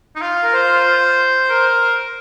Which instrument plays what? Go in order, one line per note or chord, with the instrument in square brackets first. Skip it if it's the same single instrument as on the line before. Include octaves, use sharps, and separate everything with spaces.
[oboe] D#4
[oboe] F4 [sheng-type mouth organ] F5
[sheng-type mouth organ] A#4
C5
[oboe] A#4